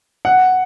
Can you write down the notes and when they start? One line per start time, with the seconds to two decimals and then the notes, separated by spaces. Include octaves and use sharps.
0.25 F#5